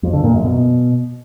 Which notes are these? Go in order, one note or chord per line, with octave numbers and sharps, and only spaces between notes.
F2
D3
A#2
F#2
B2